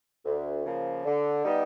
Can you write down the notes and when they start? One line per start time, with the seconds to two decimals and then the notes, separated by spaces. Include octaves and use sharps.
0.25 D2
0.65 C#3 F3 A#3
1.05 D3
1.45 G3 B3 D#4